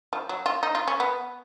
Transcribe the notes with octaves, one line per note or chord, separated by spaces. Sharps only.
F3
F#3
F4
D#4
F4
C#4
B3